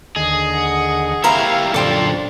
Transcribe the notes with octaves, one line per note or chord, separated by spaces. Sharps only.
D#2 D3 G#4 D#5
F#5
A#3 E4 G4 C5 E5 F5 A#5 B5
F#2 A#2 D3 D4 A4 C5 G5 D6